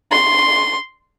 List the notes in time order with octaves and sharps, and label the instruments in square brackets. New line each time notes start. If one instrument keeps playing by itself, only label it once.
[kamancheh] C6